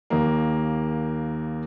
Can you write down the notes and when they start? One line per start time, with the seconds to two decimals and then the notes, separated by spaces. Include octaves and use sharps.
0.10 D#2 A#3